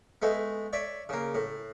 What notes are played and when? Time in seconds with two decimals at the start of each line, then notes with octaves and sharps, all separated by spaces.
0.22 G#3 A3 B3
0.73 C#5 D5 E5
1.09 C#3 A#3
1.35 A2